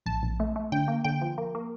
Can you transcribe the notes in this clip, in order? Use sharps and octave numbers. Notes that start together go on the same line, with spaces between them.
A#1 A5
A#1
A3
A3
D3 G5
A#3
D3 G5
F3
A#3
A#3